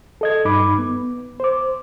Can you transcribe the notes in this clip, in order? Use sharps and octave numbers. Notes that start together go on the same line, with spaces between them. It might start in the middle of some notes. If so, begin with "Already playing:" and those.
A4 D#5 G#6
G2 D#4 B5 D6
B3
C5 D6